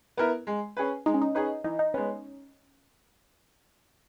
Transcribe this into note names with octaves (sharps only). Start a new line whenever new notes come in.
B3 E4 A#4
G#3
C#4 G#4 B4
G#3 D#4
C#4
D#4
C#4 D#4 G#4 B4
E3 D#4
D#4
G#3 B3 C#4